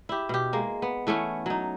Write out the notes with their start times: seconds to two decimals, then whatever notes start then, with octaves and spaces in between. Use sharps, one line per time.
0.09 E4 G4
0.29 B2 G4
0.53 G#3 A#3
0.82 B3
1.07 E3 A3 B3 C#4
1.46 F#3 D#4